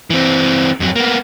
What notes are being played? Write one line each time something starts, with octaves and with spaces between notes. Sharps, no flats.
E3 C4
F2 F#3
A#3 B3